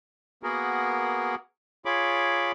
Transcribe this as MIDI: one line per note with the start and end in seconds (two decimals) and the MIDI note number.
0.43 1.35 58
0.43 1.35 59
0.43 1.35 66
0.43 1.35 68
0.43 1.35 70
1.85 2.52 65
1.85 2.52 68
1.85 2.52 73
1.85 2.52 83
1.85 2.52 86